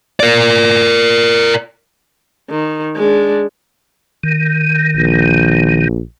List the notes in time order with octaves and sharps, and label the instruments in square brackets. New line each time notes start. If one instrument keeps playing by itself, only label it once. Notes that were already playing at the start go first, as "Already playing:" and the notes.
[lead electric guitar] A#4 D5
[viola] D#3
G#3 D4
[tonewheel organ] D#3
[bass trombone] A#1